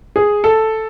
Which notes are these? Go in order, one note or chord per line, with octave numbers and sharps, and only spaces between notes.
G#4
A4